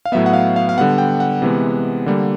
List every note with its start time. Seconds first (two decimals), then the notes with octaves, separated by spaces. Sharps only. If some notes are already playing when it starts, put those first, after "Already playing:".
0.05 F5
0.12 A2 F#3 B3 E5
0.26 F#5
0.33 F5
0.56 F5
0.69 F5
0.77 D3 G3 B3 F#5
0.98 G5
1.20 F#5
1.42 C3 E3 G#3 B3
2.06 D3 G3 A#3